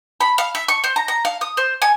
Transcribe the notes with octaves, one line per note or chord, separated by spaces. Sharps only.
B5
F5
E5
C#6
C5
A#5
A#5
F5
D#6
C5
G#5